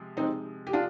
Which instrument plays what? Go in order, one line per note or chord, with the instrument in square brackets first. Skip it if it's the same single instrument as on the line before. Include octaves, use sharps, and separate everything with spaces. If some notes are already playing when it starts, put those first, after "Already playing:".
Already playing: [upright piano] C3 F3 G#3
[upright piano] C3 F3 G#3 [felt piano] C4 D#4
[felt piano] G4
D4 F4